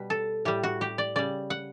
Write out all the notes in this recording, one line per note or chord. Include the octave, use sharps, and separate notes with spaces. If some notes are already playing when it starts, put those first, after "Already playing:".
Already playing: B2 G3 B4
A4
A2 G3 G4
F#4
G4
D5
C#3 G3 D5
F#5